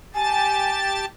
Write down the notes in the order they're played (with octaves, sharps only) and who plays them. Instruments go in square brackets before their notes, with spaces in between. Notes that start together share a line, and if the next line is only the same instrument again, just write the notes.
[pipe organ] G4 A5 A6 [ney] G#5